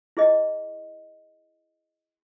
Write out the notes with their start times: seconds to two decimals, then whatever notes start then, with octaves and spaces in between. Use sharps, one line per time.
0.17 E4 G#4 D#5